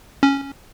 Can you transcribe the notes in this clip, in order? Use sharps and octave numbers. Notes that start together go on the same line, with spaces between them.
C#4